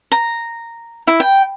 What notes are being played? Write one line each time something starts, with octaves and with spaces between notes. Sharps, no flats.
A#5
E4
G5